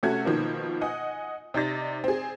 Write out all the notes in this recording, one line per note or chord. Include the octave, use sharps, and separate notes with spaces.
C3 A3 C#4 F#4 A4 G#6
B2 D#3 F3 A#3
D#5 F#5 G#5 D#6
C3 D#4 D5 A6 A#6
C4 G#4